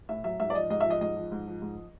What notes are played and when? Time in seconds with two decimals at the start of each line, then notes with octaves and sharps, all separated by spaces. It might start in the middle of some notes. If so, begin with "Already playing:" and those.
0.09 A2 E5
0.24 F#3 E5
0.40 G#2 E5
0.50 D5
0.54 F3 D#5
0.70 G#2 D#5
0.81 E5
0.85 F3
0.90 D#5
1.01 G#2 D#5
1.16 F3
1.32 G#2
1.47 F3
1.62 G#2